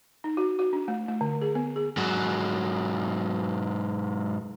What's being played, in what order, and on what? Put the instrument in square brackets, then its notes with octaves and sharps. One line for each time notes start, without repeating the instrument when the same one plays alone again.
[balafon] D#4
F#4
F#4
D4
A3
A3
D3
G#4
B3
G#4
[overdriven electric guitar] G#2 F#3